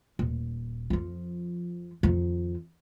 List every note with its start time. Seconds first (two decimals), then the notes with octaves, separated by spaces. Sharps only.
0.19 D#1
0.90 F2 F3
2.03 F2 D#3